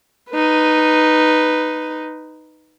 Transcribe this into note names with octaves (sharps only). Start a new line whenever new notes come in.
D#4 B4